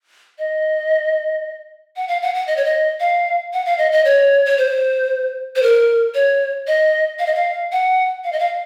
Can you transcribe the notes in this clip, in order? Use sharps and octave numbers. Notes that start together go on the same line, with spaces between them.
D#5
F#5
F5
F#5
F#5
D#5
C#5
D#5
F5
F#5
F5
D#5
D#5
C#5
C#5
C5
C5
A#4
C#5
D#5
F5
D#5
F5
F#5
F5
D#5
F5